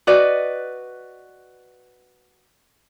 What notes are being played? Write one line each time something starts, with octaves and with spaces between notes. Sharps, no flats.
F#4 B4 D5 D#5